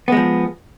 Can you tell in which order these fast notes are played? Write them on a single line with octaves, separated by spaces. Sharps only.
B3 G#3 F3